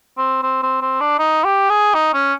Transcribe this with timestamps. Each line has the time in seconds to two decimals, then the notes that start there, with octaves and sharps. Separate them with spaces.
0.18 C4
0.43 C4
0.63 C4
0.82 C4
1.01 D4
1.19 D#4
1.45 G4
1.70 G#4
1.95 D#4
2.14 C#4